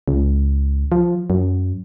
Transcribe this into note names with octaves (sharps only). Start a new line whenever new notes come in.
C#2
F3
F#2